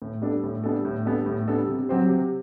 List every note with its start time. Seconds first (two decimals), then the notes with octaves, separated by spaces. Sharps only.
0.02 A2
0.22 G3 B3 D4 A4
0.44 A2
0.64 G3 B3 D4 A4
0.85 A2
1.05 G3 B3 D4 A4
1.26 A2
1.48 G3 B3 D4 A4
1.68 C3
1.89 F#3 C4 G4 C5
2.09 C3